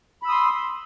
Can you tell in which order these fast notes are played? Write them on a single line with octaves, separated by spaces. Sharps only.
B5 E6 D#6 C6